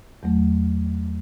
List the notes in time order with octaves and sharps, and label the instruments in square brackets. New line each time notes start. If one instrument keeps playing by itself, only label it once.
[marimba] E2 F#3 A3